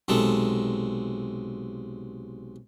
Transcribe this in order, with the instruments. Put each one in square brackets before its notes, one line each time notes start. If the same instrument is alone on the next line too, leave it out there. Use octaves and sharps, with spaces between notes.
[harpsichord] B1 C3 G#3 A4